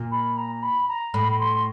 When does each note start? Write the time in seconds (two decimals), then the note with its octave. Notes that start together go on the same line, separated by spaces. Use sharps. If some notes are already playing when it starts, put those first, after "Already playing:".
Already playing: A#2
0.11 B5
0.37 A#5
0.62 B5
0.88 A#5
1.13 A2 B5
1.31 B5
1.39 C6